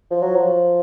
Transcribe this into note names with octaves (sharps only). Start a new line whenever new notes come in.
F3
F#3
F3